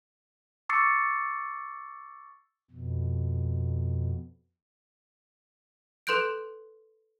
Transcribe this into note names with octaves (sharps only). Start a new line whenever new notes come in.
C#6 D6 E6 A6 C7 C#7
F2 B2
A4 B4 C6 F#6 G6 D7